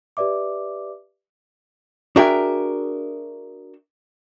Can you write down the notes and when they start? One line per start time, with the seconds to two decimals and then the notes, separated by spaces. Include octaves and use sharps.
0.17 G4 B4 D5 E5 D6
2.16 D4 F#4 G#4 A#4 E5 G5